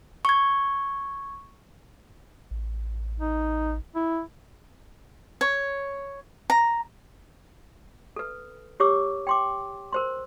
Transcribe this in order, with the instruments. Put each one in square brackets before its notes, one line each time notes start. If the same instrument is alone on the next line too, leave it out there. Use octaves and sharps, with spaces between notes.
[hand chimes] C#6 G#6
[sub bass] A1
[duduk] D#4
E4
[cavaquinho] C#5
A#5
[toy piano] A4 B4
G4 C#5 D6 E6
G5 C6 D6
A#4 C5 C6